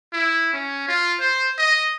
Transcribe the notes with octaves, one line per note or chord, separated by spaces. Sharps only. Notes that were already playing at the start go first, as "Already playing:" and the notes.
E4
C#4
F4
C5
D#5